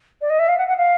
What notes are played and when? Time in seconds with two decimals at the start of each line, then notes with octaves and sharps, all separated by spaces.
0.21 D5
0.30 D#5
0.39 E5
0.48 F5
0.58 F#5
0.68 F#5
0.77 F5